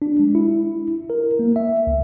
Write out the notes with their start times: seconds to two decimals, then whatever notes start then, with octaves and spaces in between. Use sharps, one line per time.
0.02 D4
0.19 G#3
0.35 E4
1.10 A#4
1.39 A#3
1.56 E5
1.87 C#2